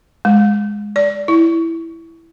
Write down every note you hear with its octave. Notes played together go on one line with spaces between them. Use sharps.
G#3
D5
E4